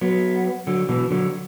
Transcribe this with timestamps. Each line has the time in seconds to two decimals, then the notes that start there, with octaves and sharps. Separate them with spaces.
0.01 F#3 B3
0.67 D3 F#3
0.89 B2 E3
1.11 D3 F#3